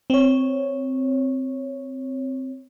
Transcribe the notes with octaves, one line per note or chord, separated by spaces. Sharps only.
C4 C#5